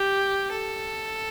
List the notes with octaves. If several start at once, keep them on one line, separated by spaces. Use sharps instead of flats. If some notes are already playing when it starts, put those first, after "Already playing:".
Already playing: G4
A4